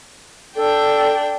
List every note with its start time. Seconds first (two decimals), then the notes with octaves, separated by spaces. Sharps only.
0.56 D4 A4 G5